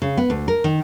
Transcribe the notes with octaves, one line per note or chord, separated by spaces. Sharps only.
C#3
B3
D2
A#4
D#3